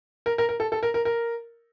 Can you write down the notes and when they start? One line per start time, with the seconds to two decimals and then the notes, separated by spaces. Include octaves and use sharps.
0.26 A#4
0.38 A#4
0.49 A#4
0.60 A4
0.72 A4
0.83 A#4
0.94 A#4
1.05 A#4